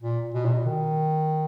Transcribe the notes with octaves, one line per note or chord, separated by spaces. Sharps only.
A#2
B2
A#2
B2
D#3